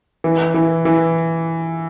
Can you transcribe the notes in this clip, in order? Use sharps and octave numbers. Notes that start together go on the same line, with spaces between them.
E3
E3
E3